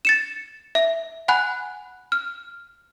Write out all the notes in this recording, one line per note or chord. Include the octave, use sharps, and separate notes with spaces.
A6 C#7 E7
E5
F#5 G#5 B5 F#6
F6